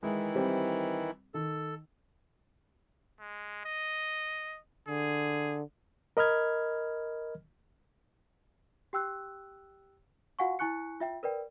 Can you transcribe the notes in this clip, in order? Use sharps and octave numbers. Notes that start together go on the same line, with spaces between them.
D#3 E3 G#3 E4
G3 C4
D#3 A4
G#3
D#5
D3 G#4
A#4 D#5 B5 F6 G#6
G4 G5 E6 F#6
F4 F#4 F5 F#5 G#5 C#6
E4 G#5 C#6 F#6 C#7
F4 E5 G5
A#4 B4 D5 G5